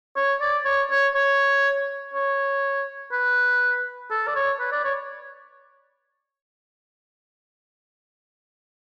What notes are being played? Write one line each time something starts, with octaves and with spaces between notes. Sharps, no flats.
C#5
D5
C#5
C#5
C#5
C#5
B4
A4
D5
C#5
B4
D5
C#5